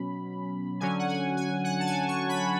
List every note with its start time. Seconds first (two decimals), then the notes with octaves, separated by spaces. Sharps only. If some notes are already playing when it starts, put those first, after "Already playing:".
Already playing: B2 F#3 C#4 B5
0.80 D3 F#3 C#4 G#5
0.99 F#5
1.09 G#5
1.37 G#5
1.64 F#5
1.80 A5
1.87 G#5
2.08 C#6
2.29 B5